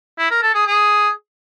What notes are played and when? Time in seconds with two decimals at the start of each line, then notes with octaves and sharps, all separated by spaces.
0.19 E4
0.31 A#4
0.43 A4
0.54 G#4
0.66 G#4